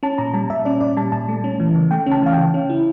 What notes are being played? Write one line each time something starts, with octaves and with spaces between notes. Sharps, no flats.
C#4 A5
A#2 A#5
G3 A5
A#2 E5
C#4 D5
A#2 D5
G3 A5
A#2 A5
A3
C#4
E3
C#3
A3 G5
C#4
A5
E3 F5
C#3 G5
C#4
E4